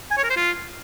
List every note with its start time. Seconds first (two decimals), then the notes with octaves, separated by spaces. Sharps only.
0.11 G#5
0.17 C#5
0.24 A#4
0.30 C5
0.37 F4